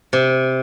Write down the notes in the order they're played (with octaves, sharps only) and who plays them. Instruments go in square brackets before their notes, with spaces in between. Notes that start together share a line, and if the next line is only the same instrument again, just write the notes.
[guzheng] C3